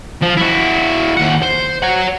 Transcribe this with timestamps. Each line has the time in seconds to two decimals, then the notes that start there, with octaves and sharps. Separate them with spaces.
0.22 F3
0.37 E4 F#4
1.17 D#2 F#5
1.42 C5
1.83 C#5 F#5